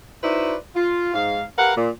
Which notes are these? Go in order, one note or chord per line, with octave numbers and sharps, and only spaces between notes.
D#4 E4 F#4 B4 C5 D5
F4
G#2 F5
G4 A#4 B4 F5 F#5
A#2